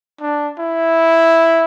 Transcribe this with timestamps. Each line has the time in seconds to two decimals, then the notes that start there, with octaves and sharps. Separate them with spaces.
0.21 D4
0.59 E4